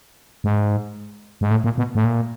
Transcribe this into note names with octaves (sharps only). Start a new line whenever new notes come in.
G#2
G#2
A2
A#2
B2
A2
A#2